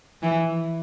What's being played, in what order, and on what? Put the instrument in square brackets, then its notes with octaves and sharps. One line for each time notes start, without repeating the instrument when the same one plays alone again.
[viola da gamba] E3